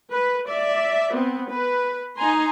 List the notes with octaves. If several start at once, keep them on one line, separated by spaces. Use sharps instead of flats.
B4
D5 E5
B3 C4
B4
D#4 G#5 A#5 C6